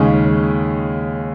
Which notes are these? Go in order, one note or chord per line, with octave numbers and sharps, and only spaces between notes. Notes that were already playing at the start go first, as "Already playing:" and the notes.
Already playing: D#2 C#3 G#3 C#4